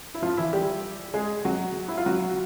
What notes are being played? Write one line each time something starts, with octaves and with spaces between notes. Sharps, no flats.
E4
F3 F4
E3 E4
G3 G4
G#3 G#4
F#3 F#4
E4
F4
F#3 F#4